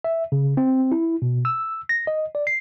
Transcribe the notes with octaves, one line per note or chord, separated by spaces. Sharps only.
E5
C#3
C4
E4
B2
E6
A#6
D#5
D5
C7